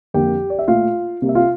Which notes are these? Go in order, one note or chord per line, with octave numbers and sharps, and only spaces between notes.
F2 D3 G3 A#3 G4 G5
D5
E5
A#2 A3 F4 F5
C3 G3 A#3
E5
F4 F5